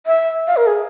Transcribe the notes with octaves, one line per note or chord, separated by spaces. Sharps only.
E5
F5
A#4
G#4